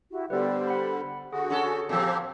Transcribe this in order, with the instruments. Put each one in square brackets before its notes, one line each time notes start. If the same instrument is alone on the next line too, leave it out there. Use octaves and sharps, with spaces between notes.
[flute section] E4 F#4 G4
[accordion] D3 G3 [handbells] B3 B4 [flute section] G4 C5 D5
[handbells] F#5 B5
[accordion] D3 F#4 [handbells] G#4 [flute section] F#5
[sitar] C#4 A4
[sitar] A#2 F3 [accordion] C4 G4 [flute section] F5 A5 E6